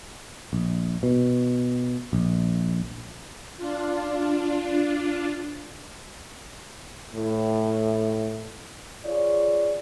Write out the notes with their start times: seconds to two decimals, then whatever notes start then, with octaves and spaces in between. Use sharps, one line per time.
0.53 A#1
1.03 B2
2.13 A#1
3.57 D4 F4
7.14 A2
9.06 F4 G#4 C#5 D5